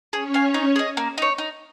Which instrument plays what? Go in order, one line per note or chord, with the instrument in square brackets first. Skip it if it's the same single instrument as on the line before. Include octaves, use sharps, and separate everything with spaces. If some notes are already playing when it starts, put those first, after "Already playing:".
[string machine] C#4 C#5 [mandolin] G#4
[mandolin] F5 G#5
D#4
G#4 D#5
A#3
D#4 C#5
D#4